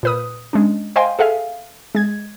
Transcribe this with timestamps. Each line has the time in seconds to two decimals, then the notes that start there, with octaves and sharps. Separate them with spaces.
0.03 A#2 B4 D#6
0.53 G#3 C#4 D4
0.96 C5 D#5 F5 G5 G#5 C6
1.19 G#4 A4 E5 F5 G#5
1.95 G#3 G#6